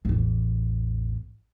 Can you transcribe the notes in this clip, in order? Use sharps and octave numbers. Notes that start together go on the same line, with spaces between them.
A1 E2